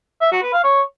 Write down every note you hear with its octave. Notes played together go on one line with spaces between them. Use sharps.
E5
F#4
B4
F5
C#5